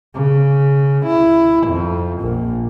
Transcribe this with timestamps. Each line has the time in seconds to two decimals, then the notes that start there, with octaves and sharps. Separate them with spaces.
0.15 C#3
1.06 E4
1.68 F2
2.20 A#1 A#2